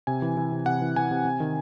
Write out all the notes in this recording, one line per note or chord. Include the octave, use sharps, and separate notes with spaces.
C3 G#5
E3
E3
C3
C3 F#5
E3
E3 G#5
C3
C3
D#3